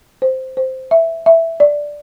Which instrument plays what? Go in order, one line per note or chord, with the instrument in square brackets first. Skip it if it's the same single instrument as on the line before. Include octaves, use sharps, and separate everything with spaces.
[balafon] C5
C5
E5
E5
D5